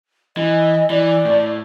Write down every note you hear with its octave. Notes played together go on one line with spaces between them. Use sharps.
E3 D#5
E3 D5
A2